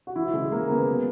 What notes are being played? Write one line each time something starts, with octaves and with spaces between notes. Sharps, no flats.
F#4
E3 E4
C#3 G#3
E3 A#3
C#3 B3
F#3